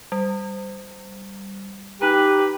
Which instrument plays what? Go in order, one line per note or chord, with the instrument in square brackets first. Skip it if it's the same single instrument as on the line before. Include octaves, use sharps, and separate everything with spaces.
[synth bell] G3
[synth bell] D#4 A#5 [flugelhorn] G4 [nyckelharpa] B4